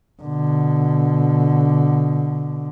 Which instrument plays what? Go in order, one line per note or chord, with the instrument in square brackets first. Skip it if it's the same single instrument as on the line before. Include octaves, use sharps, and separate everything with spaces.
[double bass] B2 D3